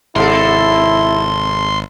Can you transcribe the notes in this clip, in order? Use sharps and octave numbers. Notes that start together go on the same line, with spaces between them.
G#1 C3 E4 A4 C6